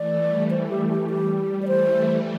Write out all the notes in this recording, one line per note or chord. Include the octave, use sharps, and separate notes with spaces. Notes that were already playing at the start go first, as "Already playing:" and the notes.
Already playing: E3 A3 D5
G3
C5
G4
G4
G4
D5
E3 A3 C5
G3